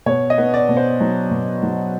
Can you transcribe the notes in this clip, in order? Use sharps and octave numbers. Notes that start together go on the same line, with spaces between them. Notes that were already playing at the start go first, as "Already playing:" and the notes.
B2 C#5
D#5
B3
D5
B2
C5
F#3
B2
F#3